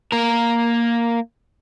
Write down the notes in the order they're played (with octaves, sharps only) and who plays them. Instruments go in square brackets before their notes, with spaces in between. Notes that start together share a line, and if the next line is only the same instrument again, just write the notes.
[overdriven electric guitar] A#3 A#4